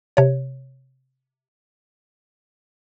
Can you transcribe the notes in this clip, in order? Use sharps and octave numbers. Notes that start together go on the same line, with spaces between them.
C3 C#5